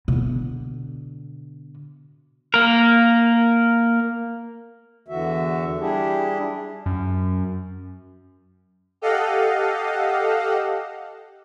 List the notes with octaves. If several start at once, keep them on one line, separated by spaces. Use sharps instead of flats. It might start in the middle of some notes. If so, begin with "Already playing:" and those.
B2 D3
A#3 A#4
E2 D3 E3 F#4 E5
G3 D4 E4 G4 G#4
F#2
G4 A4 D#5 F5 F#5